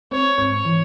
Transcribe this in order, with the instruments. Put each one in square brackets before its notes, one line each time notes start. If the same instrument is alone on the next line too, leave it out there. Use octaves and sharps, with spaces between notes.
[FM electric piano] C4 [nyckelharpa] C#5
[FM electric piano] G#2
[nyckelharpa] C#5
[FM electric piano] E3